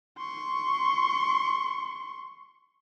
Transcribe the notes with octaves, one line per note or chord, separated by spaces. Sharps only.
C6 C#6